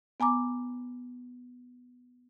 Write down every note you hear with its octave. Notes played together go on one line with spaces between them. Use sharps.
B3 G#5 A#5 D6